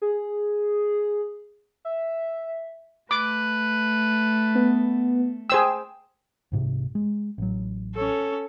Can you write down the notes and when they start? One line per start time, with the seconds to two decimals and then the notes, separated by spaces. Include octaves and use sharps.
0.02 G#4
1.85 E5
3.11 A3 B4 D6
4.55 B3
5.50 G#4 C5 G5 E6
6.52 C2 G#2 C3
6.95 G#3
7.38 A1 F#3
7.94 C#4 A4